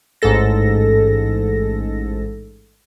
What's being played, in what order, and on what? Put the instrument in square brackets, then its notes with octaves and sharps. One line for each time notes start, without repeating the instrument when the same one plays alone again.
[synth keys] A1 G#2 G#3 A4 A#6